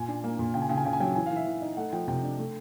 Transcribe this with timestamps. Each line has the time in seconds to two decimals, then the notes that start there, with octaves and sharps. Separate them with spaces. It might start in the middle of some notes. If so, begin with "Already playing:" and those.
Already playing: A#2 G#5
0.08 D4
0.24 A#3
0.39 A#2
0.54 C#3 G5
0.62 G#5
0.69 C#3 G5
0.77 G#5
0.85 C#3 G5
0.93 G#5
1.00 F#3 G5
1.15 E3 G#5
1.26 F5
1.31 E3 E5
1.47 E3
1.62 D#4
1.77 A3 F#5
1.93 F3 G5
2.08 C3 G5
2.23 D4
2.39 A3